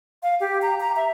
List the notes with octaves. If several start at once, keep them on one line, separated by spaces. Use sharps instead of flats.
F5
G4
A#5
A#5
E5